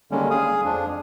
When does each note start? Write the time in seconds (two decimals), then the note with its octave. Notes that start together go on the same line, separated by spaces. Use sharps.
0.11 D3 D#3 G3 G#3 A#3 C#4
0.31 G#4 F5 D#6
0.64 F2 F3 D4